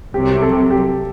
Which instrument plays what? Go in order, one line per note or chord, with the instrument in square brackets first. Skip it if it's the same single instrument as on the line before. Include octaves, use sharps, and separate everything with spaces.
[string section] C2 C3 F#3 [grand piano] G4
[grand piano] A4
G4